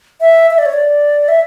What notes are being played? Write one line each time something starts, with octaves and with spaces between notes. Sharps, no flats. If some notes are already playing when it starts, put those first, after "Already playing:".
E5
E5
D5
C#5
D5
E5